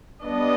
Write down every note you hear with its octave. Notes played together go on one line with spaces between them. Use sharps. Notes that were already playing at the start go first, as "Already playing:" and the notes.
G3 B3 D4 D#5